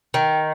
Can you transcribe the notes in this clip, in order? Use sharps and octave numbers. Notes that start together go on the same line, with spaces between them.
D#3